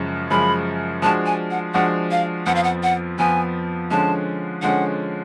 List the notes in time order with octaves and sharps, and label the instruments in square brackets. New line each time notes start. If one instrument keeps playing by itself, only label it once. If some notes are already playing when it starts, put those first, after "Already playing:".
Already playing: [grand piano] F#2 C#3 F3 G#3
[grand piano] F#2 C#3 F3 G#3 [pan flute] B5
[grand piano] F3 G#3 D4 F#4 [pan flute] A5
[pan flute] G#5
F#5
[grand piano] F3 G#3 D4 F#4 [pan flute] F#5
[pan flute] F5
[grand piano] F2 F3 B3 [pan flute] F#5
[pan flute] F5
F#5
F#5
[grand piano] F2 F3 B3 [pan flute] G#5
[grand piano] D3 F3 G#3 C#4 [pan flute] A5
[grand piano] D3 F3 G#3 C#4 [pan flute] F#5